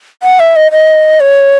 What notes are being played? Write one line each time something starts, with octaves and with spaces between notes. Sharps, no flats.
F#5
E5
D#5
D#5
C#5